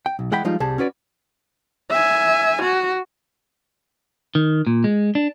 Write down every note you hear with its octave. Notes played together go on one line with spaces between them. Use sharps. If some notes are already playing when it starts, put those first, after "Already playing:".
G5
B1
E3 G#3 F#5 G5 B5
F3 G3 G#3 D#4 F4
C2 G3 G#4 A5
C#4 F#4 B4 D5
E5 G#5
F#4
D#3
A#2
G#3
D4